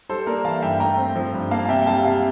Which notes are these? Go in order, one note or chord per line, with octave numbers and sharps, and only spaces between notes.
G3 A4 C5
A#3 A#4 D5
E3 F5 A5
G2 E5 G5
A3 G5 A#5
C4
F3
G2
A#3 F5 A5
A5
C3 E5 G5
G5
G3 F5 A5
C3 F5 A5